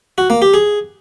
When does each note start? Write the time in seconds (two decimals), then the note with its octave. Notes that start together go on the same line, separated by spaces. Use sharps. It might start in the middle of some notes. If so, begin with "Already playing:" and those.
0.18 F#4
0.30 A#3
0.42 G4
0.54 G#4